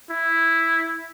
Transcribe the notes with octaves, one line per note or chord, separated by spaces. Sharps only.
E4